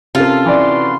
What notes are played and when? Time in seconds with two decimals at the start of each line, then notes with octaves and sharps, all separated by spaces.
0.15 C3 C#4 F4 A4 A#4
0.46 E3 F#4 B4 D5 C6